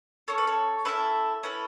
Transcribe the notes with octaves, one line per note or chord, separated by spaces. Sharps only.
C#4 A4 C#5
B4
A4 C#5
C#4 E4 A4 B4 E5
C#4 E4 A4 B4